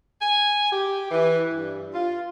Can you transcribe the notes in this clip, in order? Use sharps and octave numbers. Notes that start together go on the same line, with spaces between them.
G#5
G4
E3
G2
F4